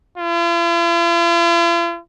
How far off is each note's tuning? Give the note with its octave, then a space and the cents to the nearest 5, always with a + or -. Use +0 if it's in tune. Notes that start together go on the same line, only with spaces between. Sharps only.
F4 -45